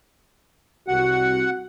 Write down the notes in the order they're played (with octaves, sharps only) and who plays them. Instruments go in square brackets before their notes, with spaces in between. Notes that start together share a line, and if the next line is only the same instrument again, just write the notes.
[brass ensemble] C2 F#4 [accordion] F#5